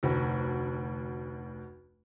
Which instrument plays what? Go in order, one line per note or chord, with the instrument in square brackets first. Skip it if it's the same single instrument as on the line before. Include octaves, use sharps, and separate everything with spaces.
[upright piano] F1 D2